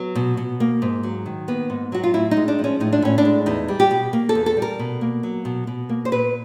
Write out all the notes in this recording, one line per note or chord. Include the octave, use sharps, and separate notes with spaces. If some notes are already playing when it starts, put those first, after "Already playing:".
Already playing: F#3 B3
B2
B2
A#3
G#2
F#3
D#3
A#3 B3
G#2
F#3 F#4
F4
A2 E4
D#4
G#3
D4
F3
C#4
A2 D#4
D4
A2 C#4
D4
G#3
E2 D#4
G3
G4
B2
A#3
A4
E2
A4
G3
A#4
B2
A#3
F#3
B2
B2
A#3
C5
A#2 B4